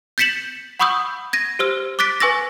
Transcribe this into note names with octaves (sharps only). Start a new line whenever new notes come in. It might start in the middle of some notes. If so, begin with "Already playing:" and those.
G6 A6 B6 C#7 E7 F#7
F#5 B5 C#6 D#6 E6 G6
G#6 A#6 D#7
G4 C5 E6 F6
D6 F#6 A6 B6 D7
B4 G#5 C#6 E6 A6 A#6